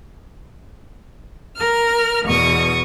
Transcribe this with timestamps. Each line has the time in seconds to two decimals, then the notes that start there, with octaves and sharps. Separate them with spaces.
1.55 A#4 F6
2.24 E2 B2 C#6 D#6